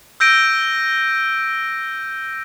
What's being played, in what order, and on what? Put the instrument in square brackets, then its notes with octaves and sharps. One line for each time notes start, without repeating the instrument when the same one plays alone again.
[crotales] E6 G6 A#6 D7 D#7